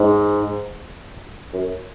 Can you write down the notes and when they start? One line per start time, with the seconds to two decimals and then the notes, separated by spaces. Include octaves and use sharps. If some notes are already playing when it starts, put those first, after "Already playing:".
Already playing: G#2
1.53 F#2